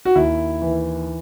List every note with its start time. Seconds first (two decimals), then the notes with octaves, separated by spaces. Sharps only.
0.05 F#4
0.15 D#2 E4
0.62 E3